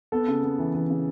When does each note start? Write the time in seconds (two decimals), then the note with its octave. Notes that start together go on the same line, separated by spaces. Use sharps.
0.12 B3 A4
0.28 C#3
0.43 B3
0.59 E3
0.75 E3
0.90 C#3